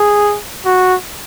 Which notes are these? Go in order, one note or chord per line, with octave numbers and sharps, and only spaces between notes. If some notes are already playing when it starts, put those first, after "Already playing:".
Already playing: G#4
F#4